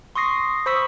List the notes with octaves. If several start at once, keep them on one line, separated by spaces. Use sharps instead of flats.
C6 C#6 D#6 A#6 C7
C5 B5 C#6 D#6 E6 B6